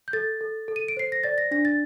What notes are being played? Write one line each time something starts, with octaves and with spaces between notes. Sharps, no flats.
G6
A4 A6
A4
A4
D#7
D7
C5 C7
A#6
D5 A6
A#6
D4 A#6
A6